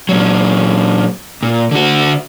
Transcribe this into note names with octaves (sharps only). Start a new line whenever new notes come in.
A#2 F#3
A#2
D3 F#4